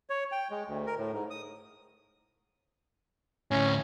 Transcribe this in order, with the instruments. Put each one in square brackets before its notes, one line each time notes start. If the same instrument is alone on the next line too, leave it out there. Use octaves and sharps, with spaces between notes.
[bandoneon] C#5
G5
G#3
D2
A#4
A2
G#2
D#6
[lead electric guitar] D2 A2 [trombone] C#4